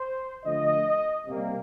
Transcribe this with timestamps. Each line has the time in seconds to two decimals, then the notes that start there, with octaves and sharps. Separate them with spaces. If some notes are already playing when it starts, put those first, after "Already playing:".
Already playing: C5
0.44 D3 F3 A3 D#5
1.27 C3 G3 A#3